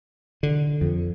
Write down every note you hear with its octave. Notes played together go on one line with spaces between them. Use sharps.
D3
F2